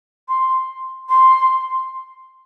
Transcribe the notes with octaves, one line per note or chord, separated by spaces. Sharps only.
C6
C6